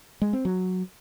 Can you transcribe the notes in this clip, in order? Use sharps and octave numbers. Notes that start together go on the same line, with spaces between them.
G#3
C4
F#3